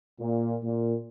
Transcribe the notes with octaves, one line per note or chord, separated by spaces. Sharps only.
A#2
A#2